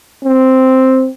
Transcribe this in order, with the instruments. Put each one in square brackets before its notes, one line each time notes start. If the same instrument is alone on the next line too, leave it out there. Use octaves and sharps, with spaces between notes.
[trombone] C4